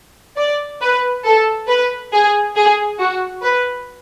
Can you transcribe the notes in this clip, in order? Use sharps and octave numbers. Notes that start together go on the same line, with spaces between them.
D5
B4
A4
B4
G#4
G#4
F#4
B4